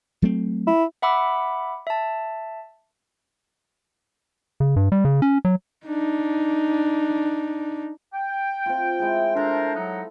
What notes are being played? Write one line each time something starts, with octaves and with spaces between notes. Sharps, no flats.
F#3 A3 C4
E4
E5 F#5 B5 D6 E6
E5 A5
C#3
G2
G3
C#3
C#4
F#3
D4 D#4
G5
C4 F4
G#3 E4 G#4
D4 A4 A#4 C5 E5
F#3 D#4 F#5